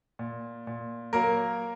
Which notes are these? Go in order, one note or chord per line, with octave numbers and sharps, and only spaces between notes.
A#2
A#2
F#3 A#3 A#4